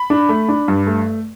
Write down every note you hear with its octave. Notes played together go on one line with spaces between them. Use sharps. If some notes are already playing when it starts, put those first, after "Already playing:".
Already playing: B5
D4
A3
D4
G2
A3